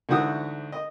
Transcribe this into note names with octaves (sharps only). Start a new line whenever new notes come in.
D2 G#2 E3 F#4 D#6 E6
D#5